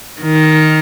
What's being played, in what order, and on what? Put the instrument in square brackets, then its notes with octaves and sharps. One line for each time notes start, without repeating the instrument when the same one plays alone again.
[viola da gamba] D#3